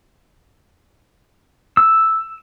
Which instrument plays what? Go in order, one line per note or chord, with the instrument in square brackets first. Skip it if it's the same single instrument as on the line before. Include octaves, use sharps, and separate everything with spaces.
[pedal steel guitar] E6